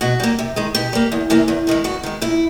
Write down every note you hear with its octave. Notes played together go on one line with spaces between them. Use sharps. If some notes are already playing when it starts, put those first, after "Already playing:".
B2 F#4
G3 A#3
C3
D#3 G#3
B2 G4
G3 A#3
E2
C3 E3 G3 A#3
E2
C3 D#3 G#3
G2 F#4
D#3 G#3
A#2 E4